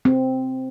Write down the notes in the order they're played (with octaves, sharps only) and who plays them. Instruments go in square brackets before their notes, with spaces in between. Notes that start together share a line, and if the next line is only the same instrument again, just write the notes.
[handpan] C4